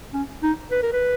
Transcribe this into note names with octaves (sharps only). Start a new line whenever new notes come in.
C#4
D#4
B4
A#4
B4